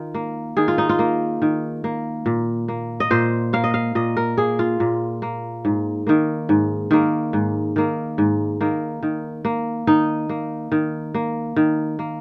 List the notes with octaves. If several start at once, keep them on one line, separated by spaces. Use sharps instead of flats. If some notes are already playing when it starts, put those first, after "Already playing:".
Already playing: D#3 F4
A#3
D#3 G#4
F4
D#4
F4
A#3
D#3
A#3
A#2
A#3
D#5
A#2 C5
A#3 F5
D#5
F5
A#2 D#5
A#4
A#3 G#4
F4
A#2
A#3
G#2
D#3 A#3
G#2
D#3 A#3
G#2
D#3 A#3
G#2
D#3 A#3
D#3
A#3
D#3 D#4
A#3
D#3
A#3
D#3
A#3